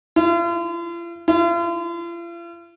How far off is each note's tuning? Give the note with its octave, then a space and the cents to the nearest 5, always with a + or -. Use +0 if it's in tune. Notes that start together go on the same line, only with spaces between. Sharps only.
F4 -45
F4 -45